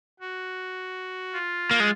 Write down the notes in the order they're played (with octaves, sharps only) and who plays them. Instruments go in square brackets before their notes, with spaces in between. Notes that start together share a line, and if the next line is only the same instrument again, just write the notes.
[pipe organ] F#4
F4
[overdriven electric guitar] A#3
G#3